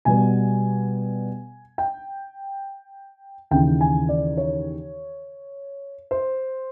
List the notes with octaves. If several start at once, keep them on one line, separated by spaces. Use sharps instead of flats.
B2 G3 B3 G#5
G5
D#2 C#3 E3 G5
G#5
D5
C#5
C5